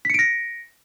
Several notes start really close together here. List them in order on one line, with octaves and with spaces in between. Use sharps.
B6 C#7 D7 A#6